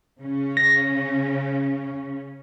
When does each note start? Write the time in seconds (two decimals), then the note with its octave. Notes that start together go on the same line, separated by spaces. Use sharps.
0.21 C#3 C#4
0.57 A#6